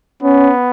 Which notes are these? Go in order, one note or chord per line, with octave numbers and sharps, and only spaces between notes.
B3 C#4